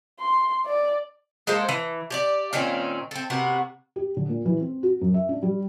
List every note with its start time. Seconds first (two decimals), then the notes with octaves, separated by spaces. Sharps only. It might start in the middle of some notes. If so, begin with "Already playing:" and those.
0.20 C6
0.66 D5
1.47 G#3 A#3 A4 C5
1.69 E3
2.10 G4 C#5 D5
2.53 A#2 D#3 C4 C#4
3.11 C4 A4
3.30 C3 B3 F#4 A#4
3.96 G4
4.17 D3
4.29 A#2
4.45 E3
4.60 C4
4.83 F#4
5.01 F#2
5.14 E5
5.29 D4
5.43 G3